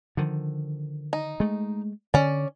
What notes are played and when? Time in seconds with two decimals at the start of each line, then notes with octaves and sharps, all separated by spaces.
0.17 D3 D#3 F3
1.13 D#4
1.40 G#3 A3
2.14 D3 C#4 D5